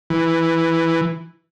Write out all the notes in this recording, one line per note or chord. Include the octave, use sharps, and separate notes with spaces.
E3